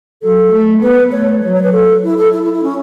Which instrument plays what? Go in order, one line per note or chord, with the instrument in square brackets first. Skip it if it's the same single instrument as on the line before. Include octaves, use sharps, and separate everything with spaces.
[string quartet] F#3 [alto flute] A4
[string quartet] A3
[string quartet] B3 [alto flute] B4
[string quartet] A3 [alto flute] C#5
[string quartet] F#3 [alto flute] C#5
[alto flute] C#5
B4
A4
E4
A4
E4
E4
E4
C#4